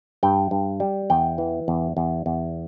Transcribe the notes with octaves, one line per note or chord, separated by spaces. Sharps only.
G2 G5
G2
G3
E2 G5
E3
E2
E2
E2